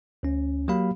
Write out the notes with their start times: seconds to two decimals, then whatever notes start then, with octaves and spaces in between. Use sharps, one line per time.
0.23 D2 C#4
0.68 F#3 A#3 G4 F5 B5